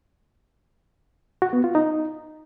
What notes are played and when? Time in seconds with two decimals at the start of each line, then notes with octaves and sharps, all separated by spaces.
1.42 F#4
1.53 B3
1.64 F4
1.75 D#4